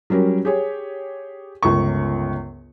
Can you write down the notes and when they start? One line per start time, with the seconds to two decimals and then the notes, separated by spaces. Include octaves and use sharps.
0.10 F#3 G3 C#4 A#4
0.45 G4 G#4 C#5
1.63 G1 C#2 A#4 C#6